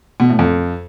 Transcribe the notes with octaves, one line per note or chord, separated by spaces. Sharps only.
B2
A2
F2